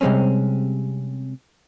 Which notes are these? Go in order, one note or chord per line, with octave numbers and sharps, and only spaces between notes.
C3 G3 G#3 C4 C#4